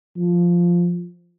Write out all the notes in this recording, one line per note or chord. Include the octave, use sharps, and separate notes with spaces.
F3